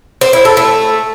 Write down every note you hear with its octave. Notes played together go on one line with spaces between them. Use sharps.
C5
E4
A4
A3